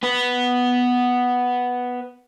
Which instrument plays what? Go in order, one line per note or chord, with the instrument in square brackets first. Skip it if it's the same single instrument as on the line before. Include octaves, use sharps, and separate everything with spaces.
[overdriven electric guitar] B3 B4